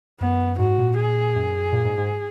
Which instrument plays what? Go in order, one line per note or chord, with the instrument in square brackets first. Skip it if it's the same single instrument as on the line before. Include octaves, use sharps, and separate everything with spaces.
[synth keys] F#2 [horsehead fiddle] B3
[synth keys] G#2 [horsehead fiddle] F#4
[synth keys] A#2
[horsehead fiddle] G#4
[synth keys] F#2
A#2
G#2
G#2